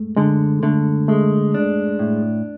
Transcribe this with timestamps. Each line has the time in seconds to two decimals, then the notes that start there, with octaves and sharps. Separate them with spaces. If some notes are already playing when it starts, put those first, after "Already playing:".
Already playing: G#3 A3
0.17 D3 G#3
0.63 D3 A3
1.08 G#3 A3
1.54 D4
1.99 A2